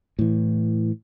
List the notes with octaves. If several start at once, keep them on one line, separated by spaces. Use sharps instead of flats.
A2 E3